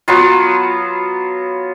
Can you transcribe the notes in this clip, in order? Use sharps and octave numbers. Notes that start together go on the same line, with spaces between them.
F#3 B3 F4